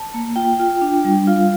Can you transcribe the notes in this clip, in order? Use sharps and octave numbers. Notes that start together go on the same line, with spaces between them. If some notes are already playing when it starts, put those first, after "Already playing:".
Already playing: A5
A#3
F4 G5
F4
D4
G3
F4 F5